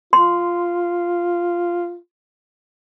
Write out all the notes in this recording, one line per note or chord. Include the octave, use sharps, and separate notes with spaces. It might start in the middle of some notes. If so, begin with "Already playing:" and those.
F4 C6